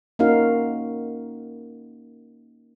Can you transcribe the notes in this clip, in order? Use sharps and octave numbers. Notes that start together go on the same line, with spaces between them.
A#3 C#4 D#4 F#4 A#4 F5